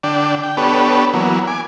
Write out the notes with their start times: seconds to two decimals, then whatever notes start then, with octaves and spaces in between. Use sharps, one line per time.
0.03 D3 D4 D5 G5
0.43 G5
0.57 B3 D4 G4 A4 B4 C#5
1.14 E3 F#3 A#3 B3
1.47 G#5 D6